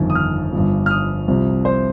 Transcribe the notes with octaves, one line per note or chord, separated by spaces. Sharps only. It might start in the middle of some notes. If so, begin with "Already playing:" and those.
Already playing: G1 F2 D#3
D#6
F6
G1 G2 F3
F6
D#6
C2 C3 F3
C5